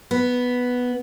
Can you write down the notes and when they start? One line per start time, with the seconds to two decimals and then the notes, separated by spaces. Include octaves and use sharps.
0.11 B3